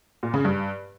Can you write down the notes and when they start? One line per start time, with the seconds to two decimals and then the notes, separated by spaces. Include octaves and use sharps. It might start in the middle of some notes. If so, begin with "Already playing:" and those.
0.23 A#2
0.34 C#3
0.45 G2